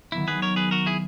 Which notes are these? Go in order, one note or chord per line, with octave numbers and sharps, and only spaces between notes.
D#3 F#3 B3 E4
G#4 B4
A#4 C#5
G#4 B4
F#4 A#4
E4 G#4